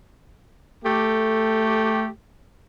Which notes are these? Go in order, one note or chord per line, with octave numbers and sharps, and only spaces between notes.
A3 G4